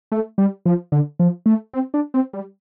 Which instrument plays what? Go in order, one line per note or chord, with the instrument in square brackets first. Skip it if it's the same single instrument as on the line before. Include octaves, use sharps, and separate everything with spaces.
[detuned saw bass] A3
G3
F3
D3
F3
A3
C4
D4
C4
G3